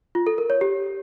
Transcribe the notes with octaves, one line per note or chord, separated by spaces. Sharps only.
F4
A4
A#4
C#5
G4